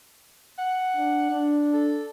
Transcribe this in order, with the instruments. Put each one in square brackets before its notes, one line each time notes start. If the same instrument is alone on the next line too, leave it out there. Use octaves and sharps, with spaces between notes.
[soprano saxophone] F#5
[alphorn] D4
D4
[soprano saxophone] A4